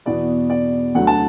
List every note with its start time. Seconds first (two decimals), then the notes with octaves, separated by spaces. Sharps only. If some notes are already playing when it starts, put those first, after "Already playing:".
0.06 E2 B2 B3 E4 D5
0.50 D5
0.95 D2 D3 F#3 A3 F#5
1.07 A5